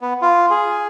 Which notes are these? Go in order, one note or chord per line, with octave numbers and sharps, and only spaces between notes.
B3
F4
G#4